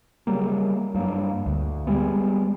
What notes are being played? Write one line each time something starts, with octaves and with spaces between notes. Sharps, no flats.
C#3 F#3 G3 A#3
G2 F#3 A#3
D2
G3 G#3 B3